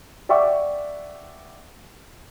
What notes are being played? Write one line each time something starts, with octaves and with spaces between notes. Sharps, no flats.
D5 E5 F#5 G5 C#6 D6